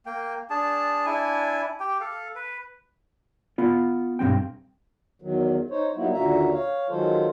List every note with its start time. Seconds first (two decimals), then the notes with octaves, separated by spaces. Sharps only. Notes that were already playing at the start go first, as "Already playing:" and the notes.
0.06 A#3 G5
0.50 D4 G#4 A5
1.06 D4 E4 G#5
1.80 G4 G5
2.00 A4 F5
2.35 B4
3.58 B3 F4
4.19 B1 G2 F#3 C4 G5
5.22 E2 D#3 F#3
5.70 D#4 C5 C#5
5.96 F#3 G3 A#3 B3 D#4 E4
6.13 D#2 A#2 D3 F#4 E5 A#5
6.53 C#5 F5
6.90 D#3 F#3 G#3 F4 A4 C5